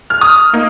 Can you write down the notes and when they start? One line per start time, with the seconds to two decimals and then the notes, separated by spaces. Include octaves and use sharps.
0.10 F6
0.21 D#6
0.53 A#3 D#4